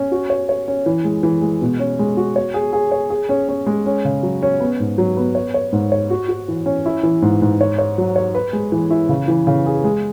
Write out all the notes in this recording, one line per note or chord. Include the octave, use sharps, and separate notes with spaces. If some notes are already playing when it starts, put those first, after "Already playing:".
Already playing: C#4
F#4
C#5
C#5
C#4
E3
G#3
E3
G#3
B2
C#4
G#3
F#4
C#5
G#4
G#4
C#5
G#4
C#4
C#4
G#3
C#4
C#3
F#3
C#4
B3
G#2
F#3
B3
C#5
C#5
G#2
C#5
F#4
F#4
E3
C#4
E4
E3
G#2
G#2
C#5
C#5
F#3
C#5
B4
G#3
E3
E4
C#3
E3
C#3
G#4
G#3